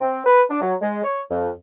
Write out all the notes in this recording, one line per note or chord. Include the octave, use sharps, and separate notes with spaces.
C4
B4
D4
F#3
G#3
C#5
F2